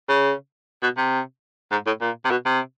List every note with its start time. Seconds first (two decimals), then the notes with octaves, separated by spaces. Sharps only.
0.09 C#3
0.83 B2
0.97 C3
1.72 G#2
1.86 A2
2.01 A#2
2.25 C3
2.31 B2
2.46 C3